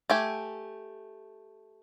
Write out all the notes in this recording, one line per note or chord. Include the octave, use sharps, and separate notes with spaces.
A3 G4 G#5